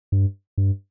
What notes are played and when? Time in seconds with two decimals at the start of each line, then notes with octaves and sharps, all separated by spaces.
0.12 G2
0.58 G2